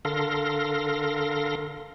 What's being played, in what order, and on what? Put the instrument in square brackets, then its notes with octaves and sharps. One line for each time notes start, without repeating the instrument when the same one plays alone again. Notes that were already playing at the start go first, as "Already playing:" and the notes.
[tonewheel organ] D3 A4 A#4 F5 C6 A#6